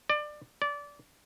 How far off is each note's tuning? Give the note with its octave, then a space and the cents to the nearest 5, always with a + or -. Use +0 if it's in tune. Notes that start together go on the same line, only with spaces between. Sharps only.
D5 +25
D5 -20